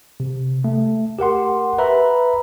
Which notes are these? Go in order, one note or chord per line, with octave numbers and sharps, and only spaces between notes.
C3
A3
G4 A#4 F#5 C6
B4 E5 A#5 B5